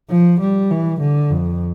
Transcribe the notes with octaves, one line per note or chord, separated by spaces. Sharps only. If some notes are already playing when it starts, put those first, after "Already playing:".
F3
G3
E3
D3
F2